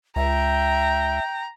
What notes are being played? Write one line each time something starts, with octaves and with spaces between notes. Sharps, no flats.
C#2 E5 G5 A#5